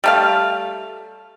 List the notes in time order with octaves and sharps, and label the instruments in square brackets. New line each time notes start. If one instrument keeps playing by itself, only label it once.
[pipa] G3 A3 F5